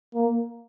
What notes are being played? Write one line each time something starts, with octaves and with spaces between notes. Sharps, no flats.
A#3